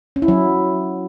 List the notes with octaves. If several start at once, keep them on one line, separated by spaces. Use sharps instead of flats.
C#4
E4
F#3